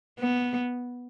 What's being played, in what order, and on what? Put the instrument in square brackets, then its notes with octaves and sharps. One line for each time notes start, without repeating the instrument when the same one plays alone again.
[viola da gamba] B3